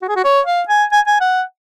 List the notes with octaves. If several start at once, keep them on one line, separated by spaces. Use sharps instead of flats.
F#4
G#4
F#4
C#5
F5
G#5
G#5
G#5
F#5